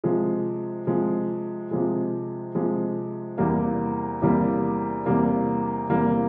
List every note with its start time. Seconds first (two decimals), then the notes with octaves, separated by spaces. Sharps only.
0.04 C3 F3 G#3
0.87 C3 F3 G#3
1.71 C3 F3 G#3
2.55 C3 F3 G#3
3.38 E2 C3 G3 A#3
4.22 E2 C3 G3 A#3
5.06 E2 C3 G3 A#3
5.89 E2 C3 G3 A#3